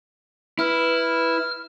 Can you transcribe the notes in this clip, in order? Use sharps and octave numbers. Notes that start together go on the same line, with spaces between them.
E4 B4 F6